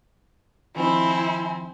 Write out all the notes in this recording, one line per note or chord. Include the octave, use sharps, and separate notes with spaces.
D#3 F3 C4 D#4 E4 G#5